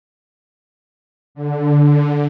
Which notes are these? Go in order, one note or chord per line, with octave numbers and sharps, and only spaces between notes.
D3